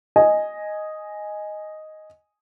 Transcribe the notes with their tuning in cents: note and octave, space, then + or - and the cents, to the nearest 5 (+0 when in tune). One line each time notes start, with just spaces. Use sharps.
D#5 +0 G#5 +0